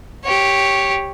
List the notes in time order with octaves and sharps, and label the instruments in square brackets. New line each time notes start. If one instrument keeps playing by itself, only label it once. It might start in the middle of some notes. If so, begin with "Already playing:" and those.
[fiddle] G4 C#5